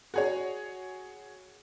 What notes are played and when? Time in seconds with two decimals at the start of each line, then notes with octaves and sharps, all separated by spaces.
0.14 F#4 G#4 C#5